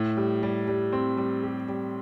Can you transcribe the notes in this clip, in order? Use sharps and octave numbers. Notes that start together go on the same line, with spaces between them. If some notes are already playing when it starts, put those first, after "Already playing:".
Already playing: A2
G3
G3
G3
C4
G3
G4
G3